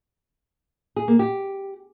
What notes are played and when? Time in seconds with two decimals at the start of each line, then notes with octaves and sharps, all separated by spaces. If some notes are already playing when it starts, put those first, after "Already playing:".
0.96 G#4
1.08 A#3
1.19 G4